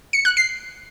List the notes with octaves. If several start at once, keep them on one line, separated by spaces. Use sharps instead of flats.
C#7
F#6
C7